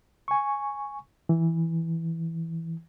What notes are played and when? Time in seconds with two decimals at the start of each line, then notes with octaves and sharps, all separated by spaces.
0.28 G#5 C#6
1.29 E3